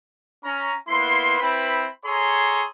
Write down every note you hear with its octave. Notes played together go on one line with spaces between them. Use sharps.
C#4 A#5
A#3 B3 E4 B4 C6
C4 E4 B4 G5 B5
G#4 A4 C#5 G#5 A#5 C6